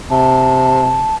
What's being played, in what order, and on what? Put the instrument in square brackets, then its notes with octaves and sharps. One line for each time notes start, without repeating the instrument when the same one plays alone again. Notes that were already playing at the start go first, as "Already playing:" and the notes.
[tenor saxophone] C3 [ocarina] A5